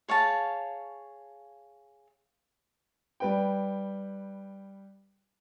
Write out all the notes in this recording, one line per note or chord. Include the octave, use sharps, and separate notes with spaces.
G#4 C#5 F5 A5
G3 B4 G5